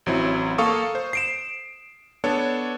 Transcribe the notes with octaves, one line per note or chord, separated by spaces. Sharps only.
A1 F#3 C4 E4
A#3 A4 F5 C#6 D#6
C5
C7 D7 E7
B3 D4 A4 C#5